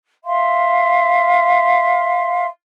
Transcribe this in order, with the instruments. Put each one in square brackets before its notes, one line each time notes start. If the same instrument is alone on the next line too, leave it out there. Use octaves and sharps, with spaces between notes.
[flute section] E5 F5 C6